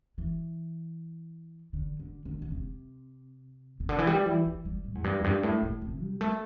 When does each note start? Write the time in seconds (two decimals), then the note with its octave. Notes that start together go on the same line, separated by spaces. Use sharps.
0.18 E3
1.73 D3
2.00 D3
2.25 D3
2.42 D3
2.51 C3
3.80 C3
3.89 D3
3.98 E3
4.07 G3
4.26 E3
4.46 E3
4.65 G3
4.85 A2
4.95 E2
5.04 G2
5.20 E2
5.24 G2
5.43 A2
5.63 A2
5.82 C3
6.01 G3
6.21 A3